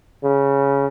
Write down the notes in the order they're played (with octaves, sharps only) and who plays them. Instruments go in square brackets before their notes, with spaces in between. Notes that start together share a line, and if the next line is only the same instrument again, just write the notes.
[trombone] C#3